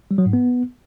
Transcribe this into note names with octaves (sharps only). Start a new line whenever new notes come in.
G3
F#3
G#2
B3